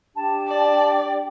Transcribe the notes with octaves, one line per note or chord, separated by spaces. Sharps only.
D4 G4 G5 A5
D5